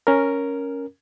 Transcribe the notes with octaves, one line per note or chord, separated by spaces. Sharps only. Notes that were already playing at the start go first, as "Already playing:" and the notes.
C#4 A#4